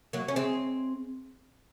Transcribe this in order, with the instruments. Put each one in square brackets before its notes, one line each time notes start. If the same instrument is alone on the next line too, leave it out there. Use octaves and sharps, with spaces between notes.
[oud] F#3 A#3
C#4
G#3 C4